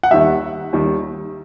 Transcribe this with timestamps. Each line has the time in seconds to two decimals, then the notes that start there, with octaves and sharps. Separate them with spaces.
0.03 F#5
0.11 D#2 D#3 G3 E5
0.73 D#2 D#3 G3